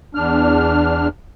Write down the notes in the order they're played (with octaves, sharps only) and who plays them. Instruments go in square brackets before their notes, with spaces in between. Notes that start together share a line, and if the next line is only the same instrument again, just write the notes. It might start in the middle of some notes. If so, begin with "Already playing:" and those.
[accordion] E2 D4 F6